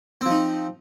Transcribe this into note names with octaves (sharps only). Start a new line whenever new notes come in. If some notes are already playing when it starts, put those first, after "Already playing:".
F3 C4 D#4